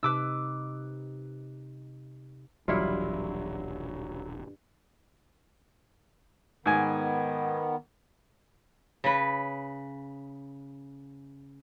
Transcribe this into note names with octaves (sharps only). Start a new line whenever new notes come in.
C3 D#4 B4 D6 E6
D#1 B1 G2 E3 F#3 E4 F4
G#2 D#3 B3 G#5
C#3 B4